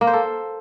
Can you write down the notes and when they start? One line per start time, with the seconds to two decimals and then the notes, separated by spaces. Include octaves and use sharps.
0.01 A#3
0.07 C5
0.13 A4